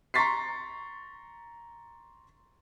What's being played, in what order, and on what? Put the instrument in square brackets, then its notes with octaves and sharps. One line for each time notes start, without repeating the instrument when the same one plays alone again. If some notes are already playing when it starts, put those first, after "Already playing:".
[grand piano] A#5 C6 C#6 A6 B6 C7